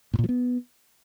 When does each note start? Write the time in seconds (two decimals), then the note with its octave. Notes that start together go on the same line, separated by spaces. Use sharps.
0.14 A2
0.19 A#2
0.24 F3
0.29 B3